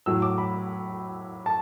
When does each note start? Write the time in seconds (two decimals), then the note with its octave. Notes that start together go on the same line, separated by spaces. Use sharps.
0.06 A2 F#3 E6
0.22 D6
0.38 B5
1.46 A5